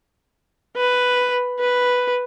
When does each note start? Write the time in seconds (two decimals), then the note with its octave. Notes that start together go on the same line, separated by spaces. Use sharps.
0.76 B4
1.60 B4